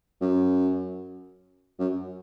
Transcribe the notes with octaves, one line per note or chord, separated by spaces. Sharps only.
F#2
F#2